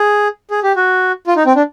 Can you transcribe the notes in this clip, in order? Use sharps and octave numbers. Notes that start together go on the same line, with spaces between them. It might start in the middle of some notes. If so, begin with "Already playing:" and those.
Already playing: G#4
G#4
G4
F#4
F4
D#4
C4
D4